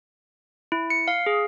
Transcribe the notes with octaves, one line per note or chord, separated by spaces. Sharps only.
E4
C#7
F5
G#4